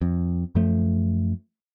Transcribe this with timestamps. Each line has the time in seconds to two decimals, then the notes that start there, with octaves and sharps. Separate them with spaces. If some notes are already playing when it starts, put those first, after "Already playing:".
0.02 F2
0.55 F#2 F3 A3